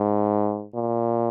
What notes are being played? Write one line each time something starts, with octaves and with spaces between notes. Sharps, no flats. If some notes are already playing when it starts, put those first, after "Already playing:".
Already playing: G#2
A#2